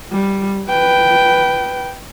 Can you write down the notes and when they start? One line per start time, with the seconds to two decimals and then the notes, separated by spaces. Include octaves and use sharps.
0.12 G3
0.70 B4 G5